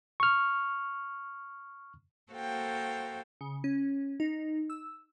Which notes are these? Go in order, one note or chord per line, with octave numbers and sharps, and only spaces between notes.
C#6 F6
A#3 F#4 A4 C5 F5 G5
C#3
C#4
D#4
E6